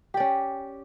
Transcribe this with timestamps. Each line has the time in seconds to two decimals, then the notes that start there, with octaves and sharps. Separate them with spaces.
0.14 G4
0.17 D5
0.20 C#4